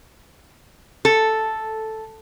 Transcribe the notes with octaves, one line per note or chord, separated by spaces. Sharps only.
A4